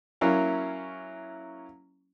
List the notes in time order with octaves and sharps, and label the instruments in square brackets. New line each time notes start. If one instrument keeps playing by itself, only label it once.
[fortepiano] F#3 A#3 C#4 E4 F5